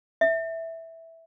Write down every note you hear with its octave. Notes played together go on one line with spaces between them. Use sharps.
E5